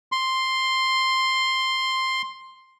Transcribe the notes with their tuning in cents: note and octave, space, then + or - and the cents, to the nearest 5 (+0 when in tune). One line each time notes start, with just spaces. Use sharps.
C6 +5